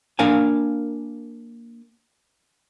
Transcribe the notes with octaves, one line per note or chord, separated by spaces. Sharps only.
A#3 D4 A#4 F5 G#5